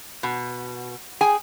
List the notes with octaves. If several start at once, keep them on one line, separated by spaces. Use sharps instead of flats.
B2
G#4 G5 G#5